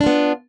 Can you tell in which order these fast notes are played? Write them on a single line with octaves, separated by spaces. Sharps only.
D4 F4 B3